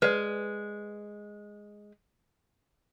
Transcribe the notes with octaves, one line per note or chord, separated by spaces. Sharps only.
G#3 B4 D5